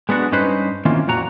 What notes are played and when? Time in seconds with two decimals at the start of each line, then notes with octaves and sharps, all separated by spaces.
0.09 G#3 B3 D4 F#4
0.32 G2 C#4 D#4 B4 C5
0.85 D#3 E3 A#3 C4 C#4 F4
1.07 F2 A#2 F#4 A#5